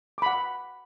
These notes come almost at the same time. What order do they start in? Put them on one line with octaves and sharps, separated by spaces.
D6 B5 F#5